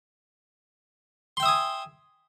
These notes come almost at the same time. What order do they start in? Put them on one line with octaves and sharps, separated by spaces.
C6 G5 E5 D#6 G#5